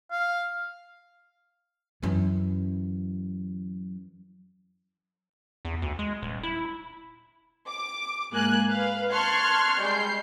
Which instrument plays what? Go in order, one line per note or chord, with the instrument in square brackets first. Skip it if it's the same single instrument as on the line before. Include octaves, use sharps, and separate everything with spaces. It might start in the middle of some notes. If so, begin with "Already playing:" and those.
[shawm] F5
[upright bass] F#2 E3
[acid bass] E2
D2
G#3
D#1
E4
[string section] D6
G#2 A#3 G#5 F#6
B4 F5
A5 C6 C#6 F6 F#6 G#6
G3 G#3 G6 C7